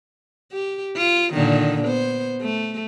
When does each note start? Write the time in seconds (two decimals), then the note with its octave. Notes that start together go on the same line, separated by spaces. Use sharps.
0.52 G4
0.96 F4
1.33 A#2 D3 D#3
1.84 B3 C5
2.41 A3